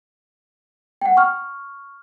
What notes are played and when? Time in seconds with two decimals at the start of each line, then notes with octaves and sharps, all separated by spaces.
1.01 F#5 G5
1.17 C#6 F6